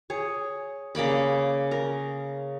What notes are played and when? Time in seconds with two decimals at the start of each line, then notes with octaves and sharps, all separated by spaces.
0.10 G#4 C#5
0.95 C#3 A#3 D5 B5
1.71 A#4